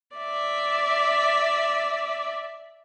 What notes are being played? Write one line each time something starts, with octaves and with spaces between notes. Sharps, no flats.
D5 E5